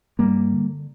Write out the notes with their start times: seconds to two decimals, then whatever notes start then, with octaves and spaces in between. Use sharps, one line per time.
0.19 G2 G3 A#3
0.52 D3